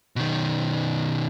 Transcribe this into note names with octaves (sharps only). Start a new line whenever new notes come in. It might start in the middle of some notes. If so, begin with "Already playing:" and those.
B2 D#3